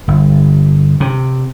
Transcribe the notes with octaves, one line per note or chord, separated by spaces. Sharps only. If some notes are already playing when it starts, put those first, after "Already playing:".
G1
C3